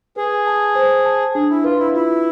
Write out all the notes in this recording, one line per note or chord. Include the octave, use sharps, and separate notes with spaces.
G#4 B4
A5
C5
A5
D4 G#4
E4
F4 B4
E4
E4 F4